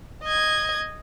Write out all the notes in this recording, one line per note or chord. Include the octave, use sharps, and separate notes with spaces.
D#5 G#6